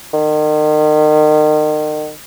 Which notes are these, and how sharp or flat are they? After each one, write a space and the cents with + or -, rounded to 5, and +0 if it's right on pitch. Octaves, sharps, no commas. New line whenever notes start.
D#3 -35